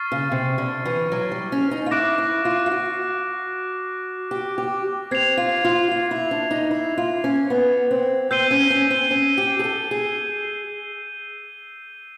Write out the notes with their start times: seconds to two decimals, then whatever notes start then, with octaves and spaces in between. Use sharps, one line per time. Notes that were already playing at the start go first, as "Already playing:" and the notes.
Already playing: C#6 F6 A6 C7
0.12 C#3
0.32 C3
0.58 D3
0.85 E3
1.12 F#3
1.32 G3
1.52 C#4
1.71 D#4
1.86 F4
1.91 E4 D6 F#6 A#6 D7
2.18 E4
2.45 F4
2.66 F4
2.71 F#4
4.31 G4
4.58 G4
5.11 C4 G#6 C7 F7
5.37 F4
5.64 F4
5.91 F4
6.11 E4
6.31 D4
6.51 D#4
6.71 E4
6.98 F4
7.24 C#4
7.50 B3
7.91 C4
8.31 C4 E6 G6 C7 D#7 G7
8.51 C#4
8.70 C#4
8.90 C4
9.11 C#4
9.37 G4
9.59 G#4
9.64 A4
9.91 G#4